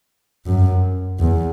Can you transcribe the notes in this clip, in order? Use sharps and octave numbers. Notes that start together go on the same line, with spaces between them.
F#2
E2